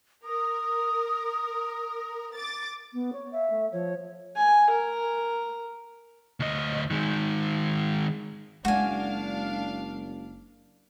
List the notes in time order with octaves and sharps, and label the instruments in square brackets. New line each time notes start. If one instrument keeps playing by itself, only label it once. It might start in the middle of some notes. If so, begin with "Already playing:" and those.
[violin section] A#4 [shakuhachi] D#6
[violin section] D6 A6
[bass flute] B3
C#5
[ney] E5 [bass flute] F5
[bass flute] A3
[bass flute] F3 [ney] C#5
[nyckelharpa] G#5
A#4
[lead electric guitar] D2 D#5
D#3 G#3
[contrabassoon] F#1 [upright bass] G#3 [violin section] D4 F5 [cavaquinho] F#4 G#5